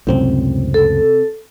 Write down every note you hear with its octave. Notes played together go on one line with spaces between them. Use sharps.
C#2 F#2 A2 C3 C4
A4